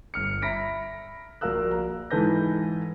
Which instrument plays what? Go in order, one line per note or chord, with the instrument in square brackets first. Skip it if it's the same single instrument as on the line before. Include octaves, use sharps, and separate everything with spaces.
[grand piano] G1 F6 C#7
E5 A#5 B5 A#6 B6 D7
A#1 F#4 A#4 F5 E6 F#6
A#5
G#2 E3 A4 B4 G6 A#6